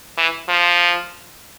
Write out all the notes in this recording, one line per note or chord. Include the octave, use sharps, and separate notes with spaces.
E3
F3